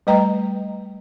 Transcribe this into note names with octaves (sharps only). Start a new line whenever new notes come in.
G3 A3 B4 D#5 G5 A#5